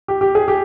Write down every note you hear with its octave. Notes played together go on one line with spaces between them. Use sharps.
G4
G4
G#4
G4